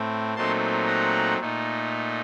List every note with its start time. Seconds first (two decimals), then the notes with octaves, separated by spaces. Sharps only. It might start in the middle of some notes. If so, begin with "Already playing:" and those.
Already playing: A2 A3 C4
0.36 A#2 F#3 A3 C4 D#4 A5 C6
0.87 F#5 A#5
1.39 A#2 A3 D#4